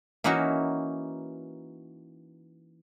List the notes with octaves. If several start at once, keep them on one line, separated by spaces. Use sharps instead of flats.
E3 A#3 C#4 D#4 E4 F#4